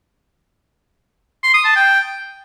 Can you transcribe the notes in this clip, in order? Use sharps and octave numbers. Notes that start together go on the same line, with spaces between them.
C6
D#6
A5
G5